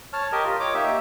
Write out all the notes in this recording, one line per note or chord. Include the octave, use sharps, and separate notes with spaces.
C#5 A5 F6
G4 A#4 D#5
F4
C#5 D#5 D6
A#3 D#4 G4 E5